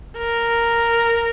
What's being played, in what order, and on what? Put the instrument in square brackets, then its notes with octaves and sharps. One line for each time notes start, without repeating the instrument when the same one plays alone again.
[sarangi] A#4